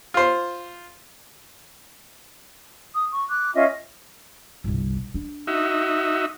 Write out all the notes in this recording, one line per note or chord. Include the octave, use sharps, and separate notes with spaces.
F4 C5
D#6
C#6
D6 F#6
C#4 F4 D#5 E5
G1 C2
D4
D#4 F#4 E5